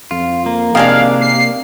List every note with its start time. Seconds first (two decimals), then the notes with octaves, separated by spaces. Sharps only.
0.11 F2 F4
0.46 A#3
0.75 C3 D#3 G#3 D4 F5
1.21 C7